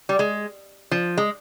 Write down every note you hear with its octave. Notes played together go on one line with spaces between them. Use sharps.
G3
G#3
F3
G#3